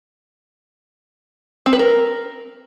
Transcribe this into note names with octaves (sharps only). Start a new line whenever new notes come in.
C4
B4
A#4